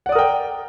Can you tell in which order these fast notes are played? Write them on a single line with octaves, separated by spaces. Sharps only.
F#5 D5 D#6 A#4 G5